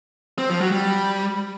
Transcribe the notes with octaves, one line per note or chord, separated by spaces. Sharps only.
C4
F3
F#3
G3